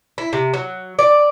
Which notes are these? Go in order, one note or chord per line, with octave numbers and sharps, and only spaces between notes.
E4
C3
F#3
D5